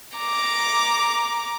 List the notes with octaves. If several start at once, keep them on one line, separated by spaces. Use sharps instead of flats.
A#5 D6